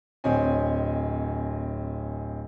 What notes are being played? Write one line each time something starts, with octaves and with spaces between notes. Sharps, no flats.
D1 C4 C#5 D#5 G#5